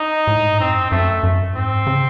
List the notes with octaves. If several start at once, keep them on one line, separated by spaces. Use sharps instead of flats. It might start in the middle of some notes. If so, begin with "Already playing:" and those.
Already playing: D#4
A2
G#2
F#2 C4
F#2 A3
F#2
G#2 C4
C#3